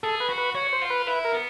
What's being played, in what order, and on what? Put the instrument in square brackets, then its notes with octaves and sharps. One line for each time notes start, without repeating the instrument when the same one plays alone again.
[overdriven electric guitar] G#4 [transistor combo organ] A4
[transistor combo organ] B4
[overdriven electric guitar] F#4
[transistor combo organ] B4
[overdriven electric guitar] F#4 [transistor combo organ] C#5
[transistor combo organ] C5
[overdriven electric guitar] F4
[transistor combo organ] B4
[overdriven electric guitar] E4 [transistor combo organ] B4
[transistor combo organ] A#4
[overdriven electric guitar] B3